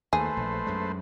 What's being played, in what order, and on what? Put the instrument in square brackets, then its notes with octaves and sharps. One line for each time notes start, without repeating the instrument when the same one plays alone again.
[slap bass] D#2 [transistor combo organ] A3 B4 C5 [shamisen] G#4
[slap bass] A#1
F#2 G#3